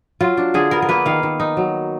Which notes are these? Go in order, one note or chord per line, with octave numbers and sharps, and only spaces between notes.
F#3 F4
D4
D3 G#4
B3 A#4
A#4
A#3 B4
D#3 F5
D#3
D#4
F#3